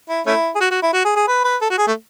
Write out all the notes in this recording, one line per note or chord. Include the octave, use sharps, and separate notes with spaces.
E4
A3 C#4 E4
G#4
F#4
F#4
E4
F#4
G#4
G#4
B4
B4
A4
F#4
G#4
A3